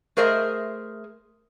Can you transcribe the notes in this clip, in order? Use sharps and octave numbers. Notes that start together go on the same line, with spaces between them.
A3 G#4 A#4 C5 D#5 E5